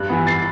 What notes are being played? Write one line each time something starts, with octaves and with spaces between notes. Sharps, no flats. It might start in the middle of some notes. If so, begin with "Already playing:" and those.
Already playing: G2 F#6
E3 B3
A6 C7